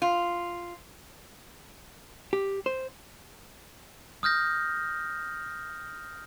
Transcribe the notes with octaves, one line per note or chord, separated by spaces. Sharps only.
F4
G4
C5
D#6 F6 G6 A#6